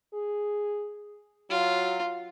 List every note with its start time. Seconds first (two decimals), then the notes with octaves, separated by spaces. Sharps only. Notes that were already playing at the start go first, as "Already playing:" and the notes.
0.14 G#4
1.50 F#3 F4